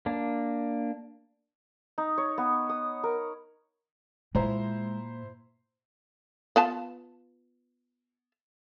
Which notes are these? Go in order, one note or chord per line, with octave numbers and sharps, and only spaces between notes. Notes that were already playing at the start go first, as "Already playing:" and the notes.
A#3 D4
D#4
C#5
B3
D#6
A#4
A#2 G#3 E4 C5 A#5
B3 F4 A5